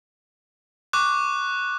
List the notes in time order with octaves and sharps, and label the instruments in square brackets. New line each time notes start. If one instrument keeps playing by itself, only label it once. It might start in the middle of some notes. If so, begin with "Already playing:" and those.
[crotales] C#6 D6 F#6